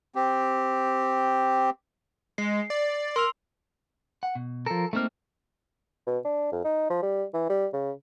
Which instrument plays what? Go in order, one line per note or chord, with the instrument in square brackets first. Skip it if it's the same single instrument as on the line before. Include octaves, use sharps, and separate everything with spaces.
[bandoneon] C4 G4
[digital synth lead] G#3 [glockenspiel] C7
[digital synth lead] D5
[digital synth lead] A#4 [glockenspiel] C6 E6 F7
[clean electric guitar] F#5
B2
[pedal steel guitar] F3 A#4 [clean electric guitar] A4
[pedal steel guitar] A3 F6 [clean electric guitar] A#3 C4 D#4
[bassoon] B2
D4
F2
D#4
F3
G3
E3
G3
C#3